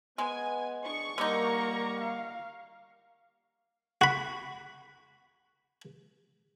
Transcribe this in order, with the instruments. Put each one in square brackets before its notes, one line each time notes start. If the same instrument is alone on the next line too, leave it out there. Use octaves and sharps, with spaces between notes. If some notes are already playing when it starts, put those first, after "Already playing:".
[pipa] G#3 [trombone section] B3 [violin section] G#5
[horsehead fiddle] D4 G#4 [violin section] C#6
[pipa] D3 D#4 [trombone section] G3 A#3 [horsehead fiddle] A#4 A#5
[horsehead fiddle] F5
[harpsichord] F#4 B5